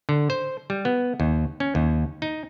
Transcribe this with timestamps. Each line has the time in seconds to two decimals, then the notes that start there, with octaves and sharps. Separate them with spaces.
0.09 D3
0.30 C5
0.70 G3
0.85 B3
1.20 D#2
1.60 C#4
1.75 D#2
2.22 D#4